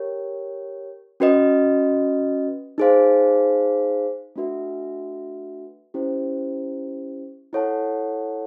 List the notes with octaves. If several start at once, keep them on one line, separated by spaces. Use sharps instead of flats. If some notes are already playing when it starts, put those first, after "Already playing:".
Already playing: G4 A#4 C#5
C#4 F#4 B4 D#5
D#4 G#4 C5 F5
A3 D4 F#4 B4 E5
C#4 E4 G4 C5
E4 A4 C#5 F#5 A5